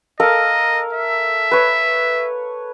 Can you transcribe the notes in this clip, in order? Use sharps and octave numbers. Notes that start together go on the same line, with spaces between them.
A4 A#4 D#5 F5
E5
B4 C#5